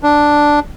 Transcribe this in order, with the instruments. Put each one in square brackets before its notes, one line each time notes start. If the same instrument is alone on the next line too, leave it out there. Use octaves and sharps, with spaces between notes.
[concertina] D4